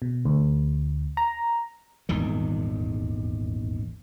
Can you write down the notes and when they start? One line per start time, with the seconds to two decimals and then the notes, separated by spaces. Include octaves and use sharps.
0.02 B2
0.25 D2
1.17 A#5
2.09 D#1 G#1 E2 D#3